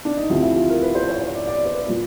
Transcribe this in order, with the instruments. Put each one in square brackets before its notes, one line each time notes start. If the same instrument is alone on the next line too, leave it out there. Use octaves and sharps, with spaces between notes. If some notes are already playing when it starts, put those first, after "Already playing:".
[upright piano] D4
D#4
D2 C3 F3 E4
E4
F4
A#4
B4
C5
C#5
C#5
D5
D5
C5
B4
A#2 F3